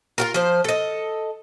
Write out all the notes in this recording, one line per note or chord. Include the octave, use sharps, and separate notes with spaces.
F4 F#4 A#4
F3 C5
A4 D#5